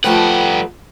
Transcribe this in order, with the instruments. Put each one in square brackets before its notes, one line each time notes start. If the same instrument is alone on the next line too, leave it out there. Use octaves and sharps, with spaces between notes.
[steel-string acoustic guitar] F3 A3 B4 [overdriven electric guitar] G3 F#5 [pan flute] G5